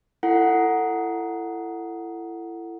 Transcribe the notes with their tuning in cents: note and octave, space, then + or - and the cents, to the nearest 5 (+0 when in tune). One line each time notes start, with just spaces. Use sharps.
E4 +30 A4 +25 F#5 +0